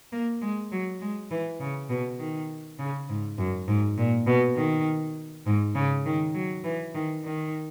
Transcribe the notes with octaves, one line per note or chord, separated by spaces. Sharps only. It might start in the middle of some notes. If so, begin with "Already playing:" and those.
A#3
G#3
F#3
G#3
E3
C#3
B2
D#3
C#3
G#2
F#2
G#2
A#2
B2
D#3
G#2
C#3
D#3
F#3
E3
D#3
D#3